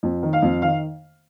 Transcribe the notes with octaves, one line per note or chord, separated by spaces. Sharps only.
F2
D#3
F5
F2
D#3 F5